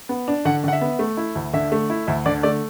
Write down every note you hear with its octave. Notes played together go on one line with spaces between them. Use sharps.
B3
D4
D3 F#5
D3 F#5
E5
B3
A3
E4
D2
D3 E5
A3
E4
D2 E5
D3 D5
A3 D5